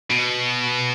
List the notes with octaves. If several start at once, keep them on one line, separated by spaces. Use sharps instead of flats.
B2